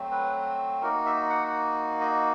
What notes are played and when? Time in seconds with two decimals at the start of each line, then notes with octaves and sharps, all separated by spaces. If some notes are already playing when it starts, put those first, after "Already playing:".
Already playing: F#3 A3 C4
0.11 B4
0.82 A#3 D#4 F#4 A#4
1.06 E5
1.30 F#5
2.01 D#5